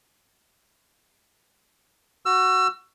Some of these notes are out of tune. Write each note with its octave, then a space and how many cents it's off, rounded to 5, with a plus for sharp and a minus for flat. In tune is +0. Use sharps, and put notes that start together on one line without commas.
F#4 +0 E6 +30